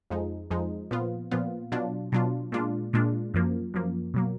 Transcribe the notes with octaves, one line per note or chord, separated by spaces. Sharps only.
F2 F3 G#3 D#4
F2 F3 G#3 D#4
A#2 F3 B3 F4
A#2 F3 B3 F4
B2 F#3 D4 F4
B2 F#3 D4 F4
A#2 G#3 D4 F4
A#2 G#3 D4 F4
F#2 F3 A#3
F#2 F3 A#3
B2 F#3 A#3